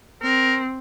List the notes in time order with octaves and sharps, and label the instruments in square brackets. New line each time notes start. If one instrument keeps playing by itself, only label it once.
[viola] C4 [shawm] A#4